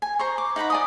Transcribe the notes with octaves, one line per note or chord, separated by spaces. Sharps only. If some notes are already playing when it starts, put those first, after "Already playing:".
G#5
C5 A#5 C#6
D6
D#4 F#5 A#5 B5
D5 G#5 D#6